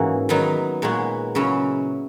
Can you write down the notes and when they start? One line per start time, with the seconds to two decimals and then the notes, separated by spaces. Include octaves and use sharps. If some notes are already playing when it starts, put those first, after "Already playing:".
Already playing: G#2 E3 A#3 C#4 F#4
0.29 D#3 F#3 B3 D#4
0.82 A#2 G#3 B3 F#4
1.35 C#3 F#3 C#4 E4